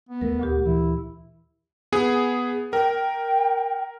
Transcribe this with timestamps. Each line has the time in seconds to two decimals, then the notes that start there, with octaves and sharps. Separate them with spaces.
0.09 B3
0.21 D#2 A3 A#4
0.39 D2 A#2 G4
0.66 E3 E4
1.92 B3 G#4
2.73 A#4 G5